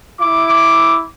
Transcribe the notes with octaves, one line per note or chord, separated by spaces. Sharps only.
E4 D6